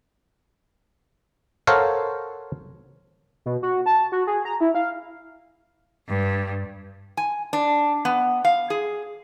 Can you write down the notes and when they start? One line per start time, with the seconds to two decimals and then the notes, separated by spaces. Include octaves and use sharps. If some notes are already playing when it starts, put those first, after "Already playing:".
1.67 A4 A#4 C5 C#5 F5 F#5
3.46 B2
3.63 F#4
3.86 A5
4.12 F#4
4.27 G#4
4.45 A#5
4.61 E4
4.75 F5
6.09 G2
7.17 G#5
7.53 D4
8.05 B3
8.45 F5
8.70 G#4